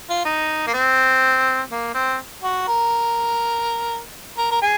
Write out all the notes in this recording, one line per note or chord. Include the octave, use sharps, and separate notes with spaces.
F4
D#4
A#3
C4
A#3
C4
F#4
A#4
A#4
A#4
G#4